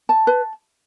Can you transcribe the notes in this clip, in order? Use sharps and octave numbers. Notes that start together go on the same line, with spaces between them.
A5
B4